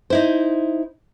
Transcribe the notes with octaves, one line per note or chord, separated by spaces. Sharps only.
D#4 E4 C5